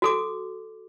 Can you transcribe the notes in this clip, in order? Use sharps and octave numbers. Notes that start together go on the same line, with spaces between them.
F#4 A4 D6